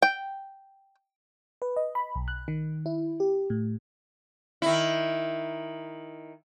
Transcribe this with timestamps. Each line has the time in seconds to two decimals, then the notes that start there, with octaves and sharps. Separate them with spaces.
0.02 G5
1.62 B4
1.76 D#5
1.95 B5
2.15 B1
2.28 F#6
2.48 D#3
2.86 E4
3.20 G4
3.50 A2
4.62 D#3 E4